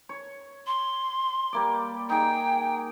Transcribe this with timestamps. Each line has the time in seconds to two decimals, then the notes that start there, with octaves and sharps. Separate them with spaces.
0.09 C#5
0.67 C6
1.53 G3 A#3 D5
2.10 D#4 G#4 G5